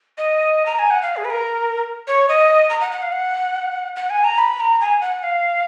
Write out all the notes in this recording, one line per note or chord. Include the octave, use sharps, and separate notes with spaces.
D#5
A#5
G#5
F#5
F5
G#4
B4
A#4
C#5
D#5
A#5
F#5
F#5
F5
F#5
F#5
G#5
A#5
B5
A#5
G#5
F#5
F5